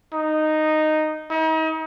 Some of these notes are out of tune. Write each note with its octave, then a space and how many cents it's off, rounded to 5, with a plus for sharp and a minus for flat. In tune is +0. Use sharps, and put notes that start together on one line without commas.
D#4 -10
D#4 +40